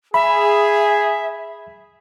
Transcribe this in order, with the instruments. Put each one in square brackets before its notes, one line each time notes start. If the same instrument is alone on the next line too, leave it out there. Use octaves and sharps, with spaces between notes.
[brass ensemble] G#4 [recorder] E5 [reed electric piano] B5